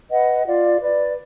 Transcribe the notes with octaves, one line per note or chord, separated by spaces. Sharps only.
B4 D#5 F#5
F4 D5 F5
B4 D5